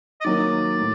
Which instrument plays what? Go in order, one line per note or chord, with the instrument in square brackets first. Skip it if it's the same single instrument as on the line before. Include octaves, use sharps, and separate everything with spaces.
[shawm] D#5
[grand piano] D#3 F#3 A#3 [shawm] D5
[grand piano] A2